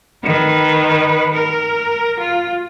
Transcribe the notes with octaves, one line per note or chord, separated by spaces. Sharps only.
D#3 B4
A#4
F4